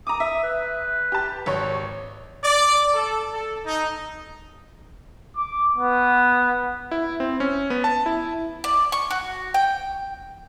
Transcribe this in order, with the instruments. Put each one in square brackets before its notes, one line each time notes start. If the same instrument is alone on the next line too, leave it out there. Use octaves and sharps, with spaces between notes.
[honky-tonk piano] A#5 D6 [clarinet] D#6
[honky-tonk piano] E5
[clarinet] B4
[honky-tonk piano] G4 A5
G#1 C#5
[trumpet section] D5
A4
A4
D#4
[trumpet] D6
B3
[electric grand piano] E4
C4
C#4
B3
A5
E4
[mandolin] D5
C#6
F#4
G5